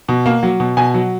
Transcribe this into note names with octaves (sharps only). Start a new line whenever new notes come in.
B2
A#3
F#3
B2
B2 G#5
F#3